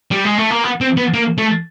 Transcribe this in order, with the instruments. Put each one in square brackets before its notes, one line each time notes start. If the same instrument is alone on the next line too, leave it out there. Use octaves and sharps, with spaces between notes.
[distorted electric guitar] G3
G#3
A3
A#3
B3
C4
B3
A#3
A3